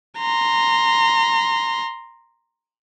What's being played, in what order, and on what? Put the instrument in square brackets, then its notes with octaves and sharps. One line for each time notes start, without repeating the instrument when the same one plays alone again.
[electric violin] A#5 C6